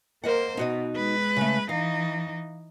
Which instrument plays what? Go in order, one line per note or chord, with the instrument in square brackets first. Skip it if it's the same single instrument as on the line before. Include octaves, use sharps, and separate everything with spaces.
[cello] A#3 C5 [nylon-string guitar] A#4 D#5 F#5
[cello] B2 [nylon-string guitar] D#4 F#4 D#5
[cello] G#3 B4
[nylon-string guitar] C#3 A3
[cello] E3 D#4 [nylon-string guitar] F5